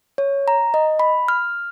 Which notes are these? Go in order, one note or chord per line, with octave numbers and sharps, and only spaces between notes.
C#5
A#5
D#5
B5
F6